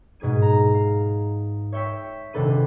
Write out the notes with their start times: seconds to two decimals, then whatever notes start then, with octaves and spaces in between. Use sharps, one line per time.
0.20 G#2 B2 G#4 G#6 D#7
0.42 A#5
0.74 F5
1.72 C#5 E5 G5 C#6 E6 B6
2.33 D#1 C3 D4 A4 B4 D#7